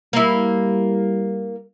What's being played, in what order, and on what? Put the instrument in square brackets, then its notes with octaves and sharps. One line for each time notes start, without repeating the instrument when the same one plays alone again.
[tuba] G3 [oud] A#3 E4